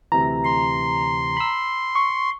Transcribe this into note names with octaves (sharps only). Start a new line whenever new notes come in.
D2 C3 E3 A#5
C6
B5 E6
C#6